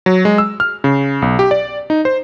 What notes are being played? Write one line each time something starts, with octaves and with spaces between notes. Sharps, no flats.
F#3
G#3
E6
F6
C#3
B1
G4
D5
D#4
C5